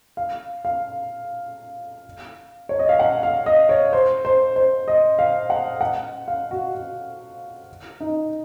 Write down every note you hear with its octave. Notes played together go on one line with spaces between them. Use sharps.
F5
F5
C#5
D#5
F5
F#5
F5
D#5
C#5
C5
C5
C5
D#5
F5
F#5
F#5
F5
F#4
F#4
D#4